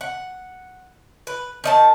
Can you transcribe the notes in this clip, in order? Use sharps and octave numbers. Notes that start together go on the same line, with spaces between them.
F#5
B4
D#3 D#5 A5